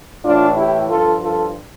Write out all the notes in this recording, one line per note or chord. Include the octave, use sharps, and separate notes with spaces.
A2 E3 D4 F4
E4 G4
G2 F3 F4 A4
F4 A4